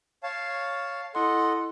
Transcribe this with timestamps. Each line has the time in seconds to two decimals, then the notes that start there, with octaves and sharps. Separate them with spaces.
0.23 C#5 F5 A5
1.15 E4 A4 D#5 F#5 C6